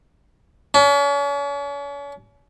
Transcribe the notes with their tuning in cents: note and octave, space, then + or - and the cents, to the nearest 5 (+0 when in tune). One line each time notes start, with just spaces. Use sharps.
C#4 +40